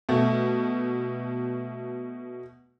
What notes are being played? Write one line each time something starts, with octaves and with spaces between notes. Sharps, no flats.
B2 A3